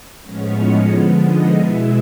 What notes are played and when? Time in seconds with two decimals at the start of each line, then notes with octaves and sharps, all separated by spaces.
0.21 A2 F3 G#3 B3 C#4 C#5
0.54 D#4 D#5
0.87 D3 F3 G#3 B3
1.20 D#4 D#5
1.53 B2 G#3 B3 E4 E5